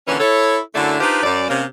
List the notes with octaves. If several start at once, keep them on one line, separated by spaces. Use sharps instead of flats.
A#2 D3 E3 C#4
E4 A4 C#5
F#2 D3 A3 D4 E4
D4 D#4 F4 G4 B4 C5
F#2 D5
C3 A#3 C#4